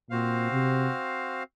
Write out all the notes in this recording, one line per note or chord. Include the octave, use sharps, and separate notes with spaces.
A#2 C4 F#4 C5 F5
C3